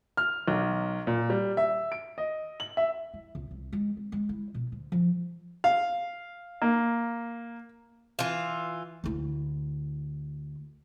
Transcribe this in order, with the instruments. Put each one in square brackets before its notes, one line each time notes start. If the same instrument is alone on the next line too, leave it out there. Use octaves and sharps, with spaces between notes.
[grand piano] F6
B1
A#2
G3
E5
D7
D#5
F#7
E5
[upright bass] E4
C#2
C2
G#3
C4
G#3
E4
B2
D2
F3
[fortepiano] F5
[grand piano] A#3
[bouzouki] E3 F4
[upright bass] D2 E4